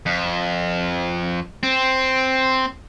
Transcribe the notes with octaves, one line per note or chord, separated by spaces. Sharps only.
F2
C4